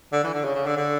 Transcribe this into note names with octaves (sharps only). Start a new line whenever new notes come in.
D3
E3
D3
C#3
C#3
D3
D3